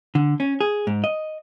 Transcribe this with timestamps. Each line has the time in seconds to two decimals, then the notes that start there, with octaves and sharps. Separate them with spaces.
0.15 D3
0.40 C#4
0.61 G#4
0.87 G#2
1.04 D#5